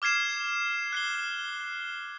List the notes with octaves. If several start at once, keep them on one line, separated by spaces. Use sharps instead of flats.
D6 F6 G#6 C7 E7
F#6 C7 G7